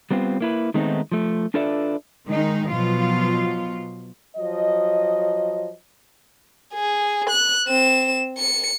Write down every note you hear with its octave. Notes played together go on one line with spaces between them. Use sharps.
G3 B3 C4 F4
A#3 E4 B4
D#3 G#3 A3 B3 C4 D#4
F3 A3
D4 F4 A4 B4 D5 E5
D#3 G#3 D#4
B2 F3 F#3 F4
F3 F#3 D#5
G#4
F#6
C4 E7
C#7